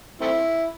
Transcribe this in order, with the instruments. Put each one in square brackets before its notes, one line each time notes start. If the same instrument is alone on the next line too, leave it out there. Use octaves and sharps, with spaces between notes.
[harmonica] A3 C4 E4